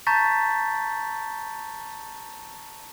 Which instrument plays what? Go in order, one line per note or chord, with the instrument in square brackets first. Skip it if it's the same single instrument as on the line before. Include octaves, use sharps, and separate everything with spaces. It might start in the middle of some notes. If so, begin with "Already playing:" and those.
[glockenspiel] A5 A#5 C#6 G6 A6 B6